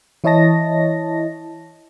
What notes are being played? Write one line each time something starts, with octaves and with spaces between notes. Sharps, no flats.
E3 E4 C#5 D#5 A5 A#6